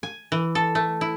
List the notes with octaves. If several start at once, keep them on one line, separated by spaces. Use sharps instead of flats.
G#5
E3
A4
A3
E4